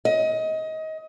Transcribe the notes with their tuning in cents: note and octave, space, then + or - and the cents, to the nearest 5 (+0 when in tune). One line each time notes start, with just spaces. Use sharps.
D#5 +25